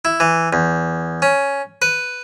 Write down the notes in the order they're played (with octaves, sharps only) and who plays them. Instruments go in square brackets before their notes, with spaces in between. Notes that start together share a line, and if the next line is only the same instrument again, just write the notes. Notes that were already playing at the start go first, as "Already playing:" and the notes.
[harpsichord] E4
E3
E2
C#4
B4